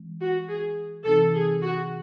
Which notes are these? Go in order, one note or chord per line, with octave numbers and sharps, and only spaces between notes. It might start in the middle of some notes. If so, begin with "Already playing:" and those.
Already playing: E3 G#3 C4
F#4
G#4
C3 E3 C4 D#4 A4
G#4
F#4